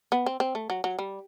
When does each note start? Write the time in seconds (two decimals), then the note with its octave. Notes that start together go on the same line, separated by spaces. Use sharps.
0.12 B3
0.26 C4
0.40 C4
0.55 A3
0.70 F#3
0.84 F#3
0.99 G3